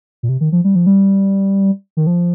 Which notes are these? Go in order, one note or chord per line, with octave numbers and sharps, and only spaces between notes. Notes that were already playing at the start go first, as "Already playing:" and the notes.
A#2
C3
D#3
F3
G3
F3
G3
D#3
F3